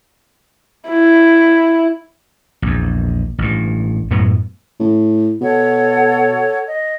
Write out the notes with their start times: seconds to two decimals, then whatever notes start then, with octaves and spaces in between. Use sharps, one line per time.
0.89 E4
2.62 A#1 E2
3.38 A1 G2
4.11 F#2 A2 F#3 B3
4.80 A2
5.41 B2 A4 C#5 F#5
6.67 D#5